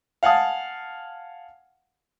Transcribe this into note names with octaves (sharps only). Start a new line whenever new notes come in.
F5 F#5 G#5 A5 D#6